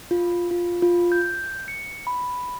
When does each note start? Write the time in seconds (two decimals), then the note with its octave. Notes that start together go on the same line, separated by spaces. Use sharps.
0.11 F4
0.51 F4
0.82 F4
1.12 G6
1.68 C#7
2.07 B5